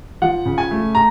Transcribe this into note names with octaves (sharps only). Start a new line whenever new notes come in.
F3 F#5
C#3
G#5
A3
A#5